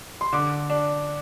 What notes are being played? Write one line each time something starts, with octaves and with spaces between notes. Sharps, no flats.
C6
D3 D6
D4